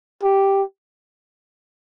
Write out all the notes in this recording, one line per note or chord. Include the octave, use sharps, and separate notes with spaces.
G4